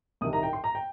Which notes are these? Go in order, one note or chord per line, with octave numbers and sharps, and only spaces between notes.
C2 C3 D#3 D#6
A#5
G5
C6
A#5
G5